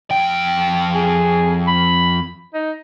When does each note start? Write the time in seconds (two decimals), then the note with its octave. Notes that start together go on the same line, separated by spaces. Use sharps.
0.11 F2 G5
0.95 G#4
1.68 B5
2.54 D#4